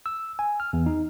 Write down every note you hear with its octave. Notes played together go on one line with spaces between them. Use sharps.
E6
G#5
F6
E2
D#4